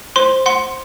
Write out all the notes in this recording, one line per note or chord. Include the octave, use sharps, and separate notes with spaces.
C5 C6
F#5 C6